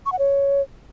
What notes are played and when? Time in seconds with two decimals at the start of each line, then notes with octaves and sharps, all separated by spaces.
0.06 C#6
0.12 F#5
0.19 C#5